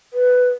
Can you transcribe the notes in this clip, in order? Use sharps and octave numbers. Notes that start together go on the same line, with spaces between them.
B4